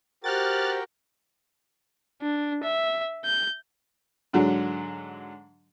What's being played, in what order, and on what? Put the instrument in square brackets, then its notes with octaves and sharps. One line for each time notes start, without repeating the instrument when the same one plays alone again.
[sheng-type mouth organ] F#4 A#4 G5 [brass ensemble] G4 [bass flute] C5 [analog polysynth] F6 F#6 A6
[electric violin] D4
E5
G6
[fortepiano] G#2 D3 F#3